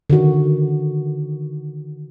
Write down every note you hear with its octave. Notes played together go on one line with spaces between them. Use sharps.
D3 D#3 F#4